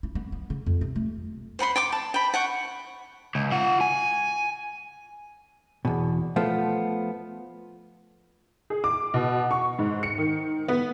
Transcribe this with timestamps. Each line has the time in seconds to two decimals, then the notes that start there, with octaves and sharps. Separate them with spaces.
0.03 E4
0.15 B3
0.32 B3
0.50 C#3
0.66 F2
0.81 C3
0.96 A3
1.59 C5 F#5 B5 C6
1.76 G5 C6 D6
1.92 A5
2.14 G5 B5
2.34 F#5 G5 C#6
3.35 C#2
3.52 F4 F#5
3.81 G#5
5.85 E2 B2
6.36 F3 A3 B3 F4
8.70 G#4
8.84 D6
9.14 B2
9.51 C#6
9.79 G#2
10.03 C#7
10.18 D#3
10.68 B3